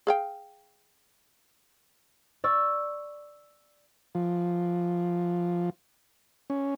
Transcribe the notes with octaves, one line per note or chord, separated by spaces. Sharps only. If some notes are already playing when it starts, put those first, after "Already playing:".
G#4 F5 G5
D5 C#6 E6
F3
C#4